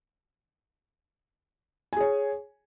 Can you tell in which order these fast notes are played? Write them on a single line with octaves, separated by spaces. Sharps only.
G#5 G#4 C#5